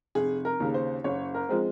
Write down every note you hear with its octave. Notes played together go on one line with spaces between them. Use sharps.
F1 G#4
A#4
D#2 C#3
C5
F#1 C#5
A#4
F3 G#3 C4